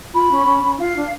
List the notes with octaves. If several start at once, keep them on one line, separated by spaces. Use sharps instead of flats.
F4 B5
C#4
C#4
C#4
F4 F5
D4